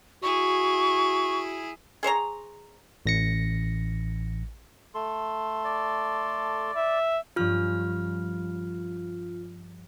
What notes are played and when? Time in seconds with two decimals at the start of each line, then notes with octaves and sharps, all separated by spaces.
0.23 E4 F#4 G#4 C#6
2.03 G#4 C5 C#5 A#5
3.06 A1 A#6 C#7
4.95 A3 A4 C6
5.64 D5
6.76 E5
7.36 G2 F3 C#4 F4 F6